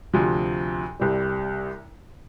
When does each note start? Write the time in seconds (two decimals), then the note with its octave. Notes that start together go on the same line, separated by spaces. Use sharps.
0.13 D2 C3 F3
1.00 C2 C3 G3